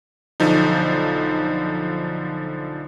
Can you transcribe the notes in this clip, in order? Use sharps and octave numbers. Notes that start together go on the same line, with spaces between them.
B1 D3 F3 D#4